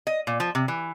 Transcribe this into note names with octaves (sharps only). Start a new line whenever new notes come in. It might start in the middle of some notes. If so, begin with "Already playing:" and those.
D#5
A#2
F3
C3
E3